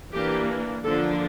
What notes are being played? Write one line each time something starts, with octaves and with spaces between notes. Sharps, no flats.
E3 A#3 D4 G4
D3 F3 A#3 D4 A4